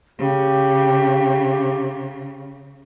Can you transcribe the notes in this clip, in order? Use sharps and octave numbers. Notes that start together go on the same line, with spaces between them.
C#3 G4